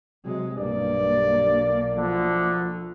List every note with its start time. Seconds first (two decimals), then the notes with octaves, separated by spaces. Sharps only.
0.25 C3 F#3 G#3
0.57 B1 G2 A#3 D5
1.97 D2 D3 F3